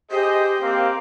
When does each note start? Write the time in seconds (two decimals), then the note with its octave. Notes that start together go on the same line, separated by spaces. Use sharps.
0.12 G4 G#4 C5 D#5
0.62 A#3 C4